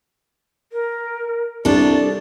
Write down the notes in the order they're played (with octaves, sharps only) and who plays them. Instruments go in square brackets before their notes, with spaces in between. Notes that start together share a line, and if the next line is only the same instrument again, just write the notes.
[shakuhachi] A#4
[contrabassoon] C2 [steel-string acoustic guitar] D4 A4 [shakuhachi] D5